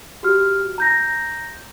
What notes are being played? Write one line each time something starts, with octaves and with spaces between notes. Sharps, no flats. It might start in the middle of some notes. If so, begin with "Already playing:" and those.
F#4 G4 F6
A#5 G6 A#6